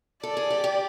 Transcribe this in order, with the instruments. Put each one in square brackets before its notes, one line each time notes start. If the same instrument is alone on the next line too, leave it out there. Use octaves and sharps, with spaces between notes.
[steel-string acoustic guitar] A4 [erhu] D5
[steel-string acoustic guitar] G#4
G4
G4